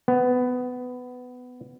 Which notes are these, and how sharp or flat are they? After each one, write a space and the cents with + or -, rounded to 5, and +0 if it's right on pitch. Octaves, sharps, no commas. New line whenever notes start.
B3 +15